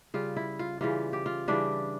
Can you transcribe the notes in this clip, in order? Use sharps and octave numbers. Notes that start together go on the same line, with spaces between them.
C#3 G3 F4
E4
F4
C#3 E3 G3 F4
G4
F4
C#3 E3 G3 D4